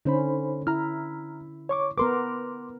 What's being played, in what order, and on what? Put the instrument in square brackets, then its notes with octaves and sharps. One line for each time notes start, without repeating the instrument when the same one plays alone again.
[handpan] D3 C#4 [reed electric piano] D#4 C5 B5
[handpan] E4 [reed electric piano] A#5 F6
[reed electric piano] C#5 C#6 D6
[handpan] B3 A#4 B4 [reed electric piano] C6 D6